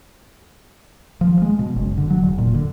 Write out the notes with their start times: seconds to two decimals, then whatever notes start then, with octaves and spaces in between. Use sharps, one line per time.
1.21 F3
1.42 G#3
1.59 B2
1.76 F#1
1.97 D3
2.10 F#3
2.22 E1
2.38 A#2
2.54 D3